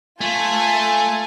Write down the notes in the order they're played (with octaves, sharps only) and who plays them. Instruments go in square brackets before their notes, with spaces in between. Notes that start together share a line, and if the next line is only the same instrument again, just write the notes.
[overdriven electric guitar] A3 [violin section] F4 G#5 A5